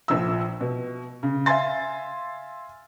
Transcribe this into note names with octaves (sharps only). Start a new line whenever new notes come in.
A#1 F3 E6
B2
C#3
E5 F5 G#5 C6 A6